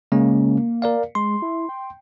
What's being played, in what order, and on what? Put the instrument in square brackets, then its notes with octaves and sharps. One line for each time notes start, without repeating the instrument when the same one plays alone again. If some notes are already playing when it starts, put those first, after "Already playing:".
[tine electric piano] C#3 G#3 C#4 [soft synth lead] A#3
[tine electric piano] A#4 D5 F5
[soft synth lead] G#3 [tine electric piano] C6
[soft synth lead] E4
G5